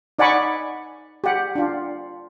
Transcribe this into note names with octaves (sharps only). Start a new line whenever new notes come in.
D#4 D5 F#5 G#5 B5 C#6
G4 F#5
D4 F4